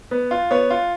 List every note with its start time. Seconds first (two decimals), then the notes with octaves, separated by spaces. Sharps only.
0.11 B3
0.31 F4
0.51 B3 C#5
0.70 F4